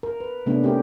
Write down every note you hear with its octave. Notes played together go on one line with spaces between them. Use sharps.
A#4
B4
C3 A3 B3 C#4 D4
A3 C#4 G4 A#4